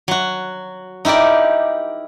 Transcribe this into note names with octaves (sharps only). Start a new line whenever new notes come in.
F#3 F#4
D#4 E4 G4 A#4 D5